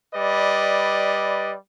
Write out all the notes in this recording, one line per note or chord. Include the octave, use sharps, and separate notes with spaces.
G3 B4 D5 D#5